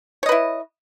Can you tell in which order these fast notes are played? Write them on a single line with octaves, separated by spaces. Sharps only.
C#5 D#5 B4 E4